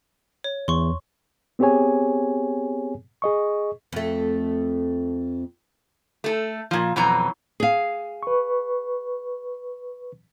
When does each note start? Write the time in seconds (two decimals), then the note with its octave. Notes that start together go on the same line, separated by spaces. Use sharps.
0.44 C#5
0.68 E2 C6 C#6
1.59 B3 C4 G4 G#4 C#5 G#5
3.22 G#4 D#5 C#6
3.93 F2 A3
6.24 A3 A4
6.71 A#2 F3
6.96 F2 B2 E3 F#3 A#5
7.60 G#4 F5
8.23 B4 C#6